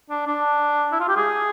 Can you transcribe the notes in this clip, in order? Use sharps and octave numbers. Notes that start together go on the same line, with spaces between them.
D4
D4
E4
F4
G4
G#4